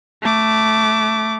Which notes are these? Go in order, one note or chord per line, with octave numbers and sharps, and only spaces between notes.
A3 D6